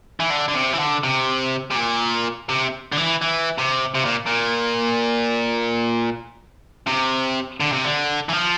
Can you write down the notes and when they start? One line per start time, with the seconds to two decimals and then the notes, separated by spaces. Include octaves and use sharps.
0.20 E3
0.30 D3
0.48 D3
0.54 C3
0.73 E3
0.79 D3
1.03 C3
1.71 C3
1.76 A#2
2.49 C3
2.92 D3
2.97 E3
3.22 E3
3.58 C3
3.95 C3
4.05 A#2
4.26 A#2
6.87 C3
7.60 D3
7.72 C3
7.84 D3
8.29 E3
8.33 F3